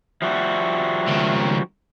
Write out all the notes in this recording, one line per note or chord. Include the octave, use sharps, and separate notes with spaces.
F3 G3 F#4 E5
C#2 D#3